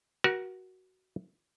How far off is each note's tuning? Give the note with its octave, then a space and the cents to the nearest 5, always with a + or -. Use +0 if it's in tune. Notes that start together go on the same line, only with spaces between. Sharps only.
F#4 +10 A#4 +40